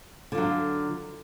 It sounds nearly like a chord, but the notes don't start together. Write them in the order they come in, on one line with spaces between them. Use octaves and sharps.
D3 F4 F#3